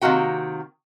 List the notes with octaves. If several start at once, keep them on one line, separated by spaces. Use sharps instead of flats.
C3 D#3 A#3 F#4 G5